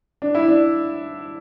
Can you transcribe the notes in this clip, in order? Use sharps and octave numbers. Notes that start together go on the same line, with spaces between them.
D4
E4
D4